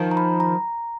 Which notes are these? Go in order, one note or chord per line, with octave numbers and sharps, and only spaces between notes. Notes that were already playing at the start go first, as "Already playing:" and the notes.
Already playing: D#3 F3
A#5
B5
A#5